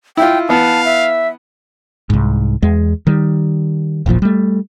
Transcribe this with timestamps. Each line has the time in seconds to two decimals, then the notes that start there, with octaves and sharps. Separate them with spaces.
0.17 E4 F4 G5
0.49 E3 B3 F5 A5
0.85 E5
2.10 C2 G#2
2.63 E2 G#3
3.07 D#3 G3
4.06 D#1 A1 A#2 F3
4.22 G3 A3